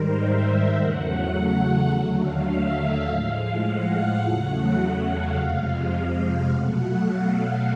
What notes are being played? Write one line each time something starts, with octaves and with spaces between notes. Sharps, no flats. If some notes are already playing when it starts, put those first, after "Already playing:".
Already playing: G#2 D#3 G3 A#4 C5
E5
E2 C#3 F#3 A3 F#5
D#2 D3 F#3 A3
F5
E5
E5
A2 F3 G#3 F5
F#5
E2 C#3 F#3 A3
F#5
F5
F2 C3 F3 G#3
B2 F#3 A3 F#5
F5